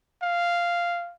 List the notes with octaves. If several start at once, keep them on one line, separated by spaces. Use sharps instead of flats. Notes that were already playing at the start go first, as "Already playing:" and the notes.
F5